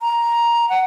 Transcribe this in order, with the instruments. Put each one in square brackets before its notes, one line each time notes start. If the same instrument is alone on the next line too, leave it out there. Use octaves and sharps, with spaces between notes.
[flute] A#5
F#5